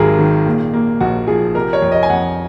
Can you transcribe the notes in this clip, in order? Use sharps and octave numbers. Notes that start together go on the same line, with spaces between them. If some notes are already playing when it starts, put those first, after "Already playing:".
Already playing: G#1 G#2 F#3 G#4 A#4
D#3
A#2
A#3
A#1 F#4
F3 G#4
C3 A#4
C#5
F2
D#5
G#5
F2 F#5